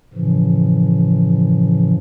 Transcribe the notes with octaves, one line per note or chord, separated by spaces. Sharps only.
F#2 A2 C#3 E3 F3